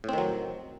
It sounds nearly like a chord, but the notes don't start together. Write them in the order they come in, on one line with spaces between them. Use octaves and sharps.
A2 C4 D#3 F#3